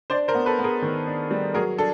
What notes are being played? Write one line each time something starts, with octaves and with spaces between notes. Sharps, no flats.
D4 C5 D5
A#4 C5
B3
A4 B4
B3
G#4 A#4
D#3
D4
G3
F#3 G#4 A#4
D4 A4